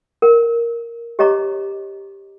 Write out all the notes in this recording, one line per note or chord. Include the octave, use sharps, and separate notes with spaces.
A#4
G4 C#5 D#5 A#5 C#6 D6